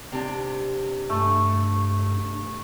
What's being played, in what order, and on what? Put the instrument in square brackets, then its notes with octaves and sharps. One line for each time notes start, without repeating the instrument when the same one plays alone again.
[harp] C3 D4
[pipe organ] G2 [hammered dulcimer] A3